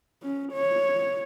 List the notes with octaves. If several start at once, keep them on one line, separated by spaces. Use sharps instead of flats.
C#4
C#5